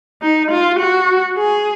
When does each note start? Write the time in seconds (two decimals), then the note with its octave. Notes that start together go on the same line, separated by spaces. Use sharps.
0.22 D#4
0.51 F4
0.80 F#4
1.38 G#4